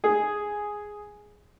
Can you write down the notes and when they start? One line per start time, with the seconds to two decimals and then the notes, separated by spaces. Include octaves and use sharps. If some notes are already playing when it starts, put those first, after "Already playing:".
0.04 G#4